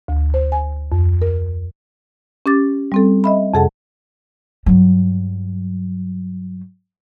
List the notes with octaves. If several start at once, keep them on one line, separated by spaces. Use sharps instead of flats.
D2
C5
G#5
F2
A#4
C#4 G4 D6 A6
G3 C4 A4
D#5 E5 B5
F2 C3 G#4 A4 F#5 A5
G2 F#3